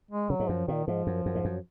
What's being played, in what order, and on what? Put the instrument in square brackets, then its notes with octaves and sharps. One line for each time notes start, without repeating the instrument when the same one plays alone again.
[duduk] G#3
[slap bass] C#3 [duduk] F#3
[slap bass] G#2
[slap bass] F#2 [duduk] F3
[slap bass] A#2 [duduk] D#3
[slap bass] G#2 [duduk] F3
[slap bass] F#2
F#2
G#2
F#2